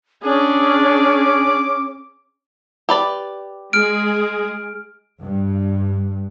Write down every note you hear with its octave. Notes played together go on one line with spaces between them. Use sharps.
C#4 D4 G#4 D6
G4 B4 D5
G#3 G#4 F6 D7
G2